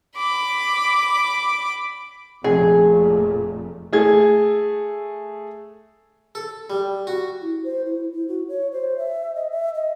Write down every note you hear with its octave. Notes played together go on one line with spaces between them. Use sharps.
B5 D6
F1 A#2 A3 G#4
A3 G#4 G#6
A4
G3
F#4
E4
C5
E4
E4
F#4
C#5
C5
E5
D#5
E5
D#5